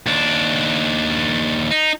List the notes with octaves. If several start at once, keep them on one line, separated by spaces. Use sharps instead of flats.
D#2 D4
D#4